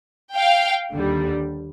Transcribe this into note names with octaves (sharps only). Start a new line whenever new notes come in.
F5 G5
D#2 D3 G3